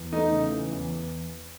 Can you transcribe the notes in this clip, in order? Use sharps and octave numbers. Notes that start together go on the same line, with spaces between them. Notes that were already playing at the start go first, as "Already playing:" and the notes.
Already playing: E2
A3 D#4
C#3
E3
E2